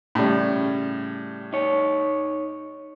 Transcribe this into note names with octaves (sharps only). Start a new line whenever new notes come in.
A2 C#3 G3
D#4 C#5